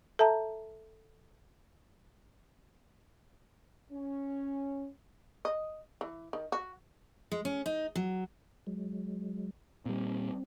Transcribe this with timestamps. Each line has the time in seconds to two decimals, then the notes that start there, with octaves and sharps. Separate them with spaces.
0.19 A4 E5 A5 A#5
3.92 C#4
5.45 D#5
6.01 E3
6.33 D#3
6.52 F#4
7.32 G#3
7.45 C#4
7.66 D#4
7.95 F#3
8.67 F#3 G#3
9.85 A#2 G3 C4